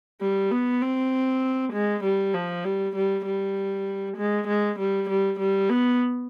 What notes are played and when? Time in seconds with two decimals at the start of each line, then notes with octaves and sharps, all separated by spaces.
0.21 G3
0.51 B3
0.82 C4
1.73 G#3
2.04 G3
2.34 F3
2.65 G3
2.96 G3
3.26 G3
4.17 G#3
4.47 G#3
4.79 G3
5.09 G3
5.39 G3
5.70 B3